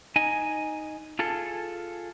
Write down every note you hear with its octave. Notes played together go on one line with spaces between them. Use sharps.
D#4 D#5 G#5
F4 G#4 A4